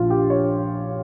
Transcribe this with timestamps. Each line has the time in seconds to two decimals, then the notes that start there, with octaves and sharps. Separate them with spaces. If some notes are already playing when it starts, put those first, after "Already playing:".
Already playing: A#1 A#2 F3 F4
0.10 G4
0.30 C#5